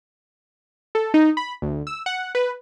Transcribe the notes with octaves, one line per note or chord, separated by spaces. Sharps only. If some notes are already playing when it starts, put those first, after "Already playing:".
A4
D#4
B5
D2
E6
F#5
B4